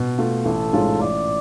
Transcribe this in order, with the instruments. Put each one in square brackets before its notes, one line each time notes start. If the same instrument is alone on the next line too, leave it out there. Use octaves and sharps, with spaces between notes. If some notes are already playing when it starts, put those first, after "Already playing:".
Already playing: [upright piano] B2
A3 F4
[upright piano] A1 [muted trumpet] A4
[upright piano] G#2 G#3 C#4 F4
[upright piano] A1 [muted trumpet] D5